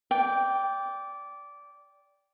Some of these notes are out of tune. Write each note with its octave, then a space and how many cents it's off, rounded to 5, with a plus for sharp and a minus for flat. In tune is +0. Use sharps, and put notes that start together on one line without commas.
D5 -15 G5 +0